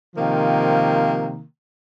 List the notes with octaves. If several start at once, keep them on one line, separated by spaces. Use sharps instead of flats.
C3 D#3 F3 A#3